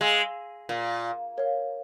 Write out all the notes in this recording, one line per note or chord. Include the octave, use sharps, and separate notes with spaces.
G#3 F5 G#5 C6 E6
A#2
A#4 C#5 F5